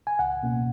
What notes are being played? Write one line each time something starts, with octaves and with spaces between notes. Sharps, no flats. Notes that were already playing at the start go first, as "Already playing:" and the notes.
G#5
C#2 F#5
B2 A#3 C#4